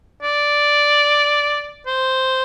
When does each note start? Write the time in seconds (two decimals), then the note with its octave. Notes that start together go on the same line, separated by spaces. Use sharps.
0.23 D5
1.87 C5